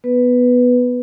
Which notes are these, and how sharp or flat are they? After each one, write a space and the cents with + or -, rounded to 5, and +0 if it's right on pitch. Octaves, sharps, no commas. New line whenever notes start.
B3 +0 B4 +0